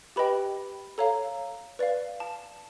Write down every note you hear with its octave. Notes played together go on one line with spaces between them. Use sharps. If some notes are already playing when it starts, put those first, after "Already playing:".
G4 B4 D#5 G5 B5
A4 C#5 F5 A#5
B4 D5 F5
A5